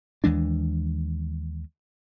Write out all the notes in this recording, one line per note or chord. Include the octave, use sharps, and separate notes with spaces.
D#2 E3 G#3 D4